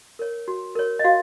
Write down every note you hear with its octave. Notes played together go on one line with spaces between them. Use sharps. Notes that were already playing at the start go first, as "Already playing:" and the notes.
A#4 C#5
F#4
A#4 C#5
D#5
F#4 F5